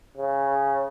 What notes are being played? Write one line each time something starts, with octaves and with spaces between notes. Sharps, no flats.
C#3